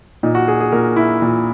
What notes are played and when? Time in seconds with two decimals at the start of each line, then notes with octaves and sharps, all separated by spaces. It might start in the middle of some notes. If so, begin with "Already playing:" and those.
0.23 A#2 D#4
0.35 F#4
0.48 G#4
0.60 G#4
0.72 A#2 A#4
0.96 E4
1.22 A#2